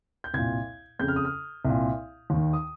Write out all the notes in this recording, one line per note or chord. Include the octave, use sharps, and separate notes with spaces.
G6
C2 A#2 G#6
F2 C#3 G6
F6
D#6
F6
C2 A#2
D#2 D#3
D#6